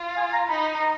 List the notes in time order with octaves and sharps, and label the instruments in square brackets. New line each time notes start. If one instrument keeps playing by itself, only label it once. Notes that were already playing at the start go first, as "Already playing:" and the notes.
Already playing: [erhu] F4
[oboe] G#5
A#5
[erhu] D#4 [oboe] B5
[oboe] A#5